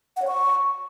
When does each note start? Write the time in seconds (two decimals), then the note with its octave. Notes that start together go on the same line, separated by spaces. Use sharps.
0.16 F#5
0.22 C#5
0.27 C#6